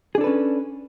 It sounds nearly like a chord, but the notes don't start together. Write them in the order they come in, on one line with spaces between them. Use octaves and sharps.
G#4 D4 A4 B4 C#4